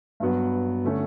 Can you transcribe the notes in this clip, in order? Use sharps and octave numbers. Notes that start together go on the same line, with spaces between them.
G2 F#3 B3
D3 A3 C#4